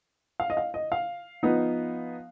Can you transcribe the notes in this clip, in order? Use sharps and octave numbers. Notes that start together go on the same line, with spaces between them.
F5
D#5
F5
D#5
F5
F3 B3 D#4